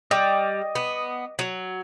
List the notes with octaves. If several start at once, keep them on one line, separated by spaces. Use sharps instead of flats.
G3 D#5 D6
B3
F#3